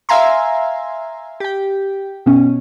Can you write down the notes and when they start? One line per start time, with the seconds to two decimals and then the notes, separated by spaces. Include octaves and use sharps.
0.09 E5 F5 G#5 A#5 C6
1.40 G4 G5
2.26 B2 C#4